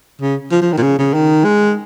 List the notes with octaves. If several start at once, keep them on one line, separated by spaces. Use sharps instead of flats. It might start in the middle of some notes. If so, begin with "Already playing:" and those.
C#3
F3
F3
D#3
A#2
C#3
C#3
D#3
G#3